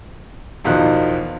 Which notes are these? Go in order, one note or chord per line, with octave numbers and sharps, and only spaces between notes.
E2 B2 D#3 F3 F#6